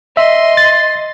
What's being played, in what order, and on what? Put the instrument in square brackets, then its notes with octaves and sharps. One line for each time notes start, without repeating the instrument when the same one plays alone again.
[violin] D#5 C6 [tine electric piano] E5
[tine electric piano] A6